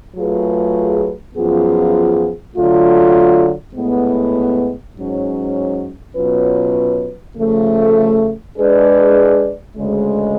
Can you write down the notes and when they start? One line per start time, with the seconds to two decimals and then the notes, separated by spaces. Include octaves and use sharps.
0.15 F#3 A3 F4 G#4 B4
1.35 F#2 F3 B3 F4 G#4
2.56 D3 F#3 A3 F4
3.75 A2 G#3 B3
4.95 G#2 F#3 C#4
6.15 B2 F#3 C#4 F4 B4
7.36 C#3 F3 A3
8.56 G#3 D4 G#4 B4 D5
9.76 D2 C#3 G#3